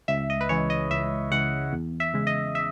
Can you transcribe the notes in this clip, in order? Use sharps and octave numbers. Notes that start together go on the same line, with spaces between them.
C#2 E5
D#5
B4
C#3 E3 G#3 C#5
D#5
C#2 E5
C#3 E3 G#3 F#5
E2
E5
C#3 G#3
D#5
E5